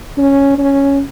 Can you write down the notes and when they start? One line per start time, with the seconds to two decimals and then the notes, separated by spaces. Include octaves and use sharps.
0.18 C#4
0.58 C#4